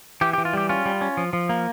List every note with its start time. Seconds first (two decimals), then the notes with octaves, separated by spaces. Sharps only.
0.21 E3 G4
0.33 G4
0.38 E3
0.45 F4
0.53 G3 G4
0.69 C#4 F4
0.86 G3
1.01 C#4
1.17 F3
1.33 F3
1.49 A#3